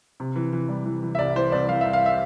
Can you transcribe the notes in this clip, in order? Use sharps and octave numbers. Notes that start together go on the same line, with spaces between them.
C3
E3
E3
G3
E3
E3
E5
C2 D5
E3 C5
C2 D5
E3 F5
E5
C2
F5
E5